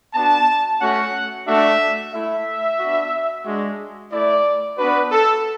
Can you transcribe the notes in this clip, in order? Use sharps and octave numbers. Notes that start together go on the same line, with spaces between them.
B3 D4 F#4 A5
A3 C#4 F#4 F#5
A3 D4 F#4 E5
A3 E4 E5
B3 D4 F#4
G#3 D4 F#4
A3 E4 D5
B3 D4 F#4 B4
A4